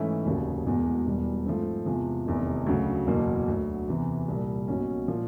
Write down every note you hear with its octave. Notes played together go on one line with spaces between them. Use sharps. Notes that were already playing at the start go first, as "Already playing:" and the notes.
Already playing: G#2 E3 A3 C#4 E4
F1 D#2 C#3 F#3
E1 E2 B2 G#3
E1 E2 B2 G3
G#2 F3 A3 C4
E2 C3 F3 G#3
F1 E2 C3 D#3
D2 C#3 F#3
F#1 E2 B2 F#3 A#3
D2 D3 F#3
E2 C3 E3
C2 A#2 G3
B1 B2 F#3 A#3 C#4
A#2 F3